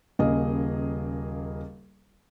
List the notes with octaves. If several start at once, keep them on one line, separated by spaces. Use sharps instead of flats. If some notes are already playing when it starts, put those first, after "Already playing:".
D#1 C#3 A#3 G#4 D#5